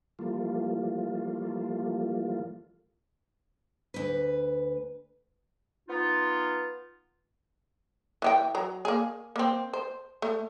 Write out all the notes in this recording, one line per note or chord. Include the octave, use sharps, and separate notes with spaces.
E3 F3 G3 A3 A#3 F4
D2 B4
B3 D#4 F4
E3 G4 G5
F#3 A#5
A#3 G#4
A#3 C4
C5
A3